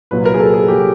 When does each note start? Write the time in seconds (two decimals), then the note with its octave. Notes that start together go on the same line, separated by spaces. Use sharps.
0.11 C2 A#2 F#3 B4
0.25 A#4
0.34 G#4
0.40 A4
0.54 G#4
0.68 C2 A#2 F#3 G4